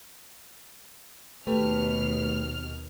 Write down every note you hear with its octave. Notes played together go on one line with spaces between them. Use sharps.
D#2 B2 A3 G4 B4 F6